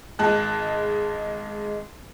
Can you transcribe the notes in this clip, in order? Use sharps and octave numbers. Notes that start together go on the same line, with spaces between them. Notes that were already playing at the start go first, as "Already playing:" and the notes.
G#1 G#3 A5 F#6